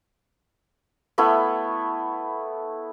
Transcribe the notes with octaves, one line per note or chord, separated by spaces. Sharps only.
A3 B3 E4